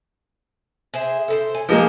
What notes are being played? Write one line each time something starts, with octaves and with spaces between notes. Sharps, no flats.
G#4 C5 E5
A4 B4 C5
G#5
F3 G#3 A#3